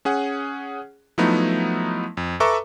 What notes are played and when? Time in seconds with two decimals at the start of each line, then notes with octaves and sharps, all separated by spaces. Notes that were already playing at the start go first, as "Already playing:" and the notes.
0.05 C#4 G#4 F#5
1.18 F3 F#3 A3 B3 D#4 E4
2.17 F2
2.40 A4 B4 E5 A#5 C#6 D6